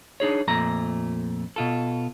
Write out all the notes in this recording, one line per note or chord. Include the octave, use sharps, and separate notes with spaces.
D4 D#4 G#4 C#5
F2 A#2 A3 A#5
B2 F4 A4